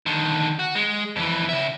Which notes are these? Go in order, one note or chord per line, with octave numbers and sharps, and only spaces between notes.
D3 D#3
F#4
G#3
F2 E3
C#3 E5